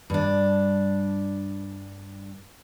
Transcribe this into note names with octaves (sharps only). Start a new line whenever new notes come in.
G2 D4